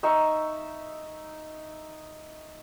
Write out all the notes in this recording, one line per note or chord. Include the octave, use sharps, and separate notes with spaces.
D#4 E5 C#6